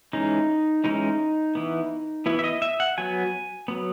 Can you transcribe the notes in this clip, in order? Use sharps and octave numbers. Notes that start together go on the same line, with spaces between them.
E3 G#3 C#4 D#4
E3 G#3 C#4 D#4
E3 B3
E3 B3 E4
E5
D#5
E5
F#5
F#3 B3 G#5
F#3 B3